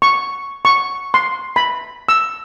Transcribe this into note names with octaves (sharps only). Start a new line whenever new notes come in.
C#6
C#6
C6
B5
E6